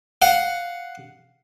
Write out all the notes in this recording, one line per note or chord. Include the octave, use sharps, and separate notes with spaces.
F5 F#5